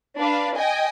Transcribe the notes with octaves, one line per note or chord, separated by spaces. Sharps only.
D4 B4 F5
D#5 G5 G#5